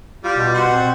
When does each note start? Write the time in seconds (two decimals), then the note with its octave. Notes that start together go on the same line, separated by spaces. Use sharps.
0.24 G3 F4
0.37 B2
0.54 F#4 C5 F#5
0.72 C4